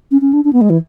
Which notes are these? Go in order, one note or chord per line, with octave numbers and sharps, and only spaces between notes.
C#4
C#4
D4
D4
B3
G#3
E3